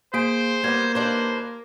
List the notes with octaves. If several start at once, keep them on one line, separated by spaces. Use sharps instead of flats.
A#3 G#4 C5 D7
G3 A#3 B3 G#6
D#2 D4 B4 C5